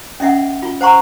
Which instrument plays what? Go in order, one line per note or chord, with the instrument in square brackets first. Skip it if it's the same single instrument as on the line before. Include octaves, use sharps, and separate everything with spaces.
[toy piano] C#4 D#5 E5 F#5
F4
C5 F#5 A#5 C#6